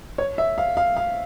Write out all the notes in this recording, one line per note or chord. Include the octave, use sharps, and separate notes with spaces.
C#5
E5
F5
F5
F5